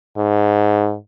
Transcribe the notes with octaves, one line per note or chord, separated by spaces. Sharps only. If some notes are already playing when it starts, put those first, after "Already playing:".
G#2